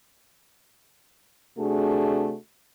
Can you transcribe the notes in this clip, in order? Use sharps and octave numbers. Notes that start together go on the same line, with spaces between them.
C3 A3 D4 F#4 G#4